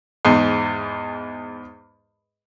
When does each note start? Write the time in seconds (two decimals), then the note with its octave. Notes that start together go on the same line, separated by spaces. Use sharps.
0.25 E2 G#2